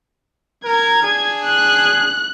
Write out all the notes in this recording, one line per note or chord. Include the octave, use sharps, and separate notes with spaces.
A#4 G#6
D4 G#4
F#6